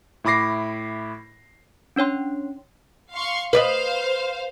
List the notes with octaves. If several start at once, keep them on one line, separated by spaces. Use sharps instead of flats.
A2 E4 B5 D6 A#6 C7
C#4 D4 C#5 G5 C6
F5 C6 C#6
B4 C5 D5 D#5 F5